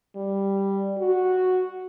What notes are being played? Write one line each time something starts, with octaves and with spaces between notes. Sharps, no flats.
G3
F#4